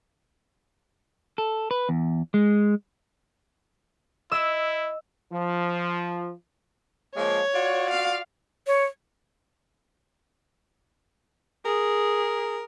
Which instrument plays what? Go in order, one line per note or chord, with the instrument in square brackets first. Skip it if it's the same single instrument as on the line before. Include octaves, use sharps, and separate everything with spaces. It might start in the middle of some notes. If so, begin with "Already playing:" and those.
[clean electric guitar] A4
B4
E2
G#3
[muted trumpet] E4 [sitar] D#5 [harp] E6
[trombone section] F3
[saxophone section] F3 G#3 A#3 [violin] C#5
[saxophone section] F4 F#4 D5
[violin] F5
[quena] C#5
[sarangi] G#4 [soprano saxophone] A#4